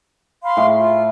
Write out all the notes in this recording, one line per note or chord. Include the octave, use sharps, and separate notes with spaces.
F5 B5 C6
A2
F4